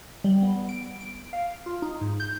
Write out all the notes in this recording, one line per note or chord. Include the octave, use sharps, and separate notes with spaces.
G3
B3
D7
D7
F5
F4
D#4
G#2
G6